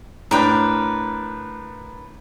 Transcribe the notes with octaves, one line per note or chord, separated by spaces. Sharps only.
A2 D4 A#4 B4 G5